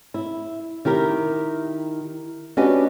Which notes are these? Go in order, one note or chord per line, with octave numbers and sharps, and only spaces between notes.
E4
D#3 E4 G4 A#4
C#4 D4 F#4 G4 B4 D#5